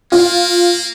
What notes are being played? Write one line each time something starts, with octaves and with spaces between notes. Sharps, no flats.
A#3 F4